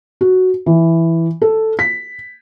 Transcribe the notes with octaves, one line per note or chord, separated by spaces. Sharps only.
F#4
E3
A4
B6